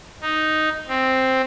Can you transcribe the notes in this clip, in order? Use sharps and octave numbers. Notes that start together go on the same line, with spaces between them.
D#4
C4